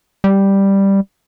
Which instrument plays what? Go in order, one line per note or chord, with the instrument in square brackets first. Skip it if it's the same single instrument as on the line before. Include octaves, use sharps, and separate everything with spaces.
[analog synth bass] G3